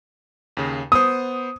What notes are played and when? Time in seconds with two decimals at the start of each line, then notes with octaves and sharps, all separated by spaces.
0.57 D#2 C#3
0.92 B3 C5 D#6